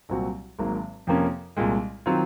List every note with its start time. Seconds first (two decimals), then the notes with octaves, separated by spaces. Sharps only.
0.09 C2 A#2 F#3 C4 F#4
0.59 G#1 G#2 F#3 A#3
1.07 F2 C3 F3 A#3 C#4
1.57 C2 A#2 G#3
2.06 D#3 F#3 C4 F4